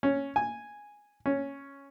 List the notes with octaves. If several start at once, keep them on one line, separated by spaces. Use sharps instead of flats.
C#4
G#5
C#4